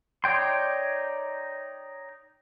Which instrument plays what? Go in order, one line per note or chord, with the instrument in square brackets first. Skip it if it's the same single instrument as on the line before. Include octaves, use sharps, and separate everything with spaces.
[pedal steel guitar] D#4 C#5 D5 G5 C6